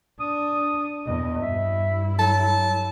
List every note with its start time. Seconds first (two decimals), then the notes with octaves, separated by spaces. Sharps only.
0.20 D4 D#6
1.06 E2 D#5
1.41 G2 E4 E5
2.19 F#3 A5